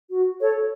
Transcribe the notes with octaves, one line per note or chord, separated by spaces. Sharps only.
F#4
A4 C#5